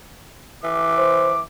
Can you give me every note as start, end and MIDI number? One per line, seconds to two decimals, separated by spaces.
0.63 1.42 52
0.63 1.42 86
0.98 1.33 72